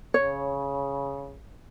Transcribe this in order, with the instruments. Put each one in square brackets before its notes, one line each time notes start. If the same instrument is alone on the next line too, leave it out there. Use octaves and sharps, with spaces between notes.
[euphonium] C#3 [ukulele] C#5